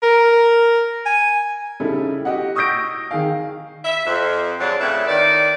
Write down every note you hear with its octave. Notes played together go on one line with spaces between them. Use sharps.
A#4
G#5
C#3 G3 D#4 E4 G4 A4
F#4 G4 D#5 F#5
C#6 D#6 E6 G6 A#6 D7
D#3 G#4 F5
E5
F2
F2 D3 F#3 G#3 C4 D4
F2 A2 C#3 E4 B4 E5
D#3 D5